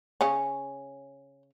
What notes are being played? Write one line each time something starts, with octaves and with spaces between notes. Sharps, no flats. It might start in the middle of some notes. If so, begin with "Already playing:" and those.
C#3 C#4